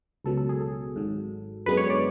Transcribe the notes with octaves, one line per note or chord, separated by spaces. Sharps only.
C#2 B2 F#3 A4
A4
G#4
A4
G#1 G#2 F#3
F#2 D3 G#3 B3 B4
C#5
D5